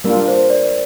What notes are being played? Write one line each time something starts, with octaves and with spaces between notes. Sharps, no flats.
G3 A#3 D4 F4 A#4
C5
D5